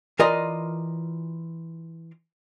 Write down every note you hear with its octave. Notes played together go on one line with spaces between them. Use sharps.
E3 F4 A#4 D5 D#5 C6